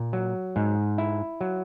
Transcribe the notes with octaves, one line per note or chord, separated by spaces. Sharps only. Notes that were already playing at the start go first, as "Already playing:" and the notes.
Already playing: A#2
F#3
G#2
E4
F#3